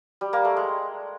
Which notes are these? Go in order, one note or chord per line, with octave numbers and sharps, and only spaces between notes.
G3
A#3
A3
G#3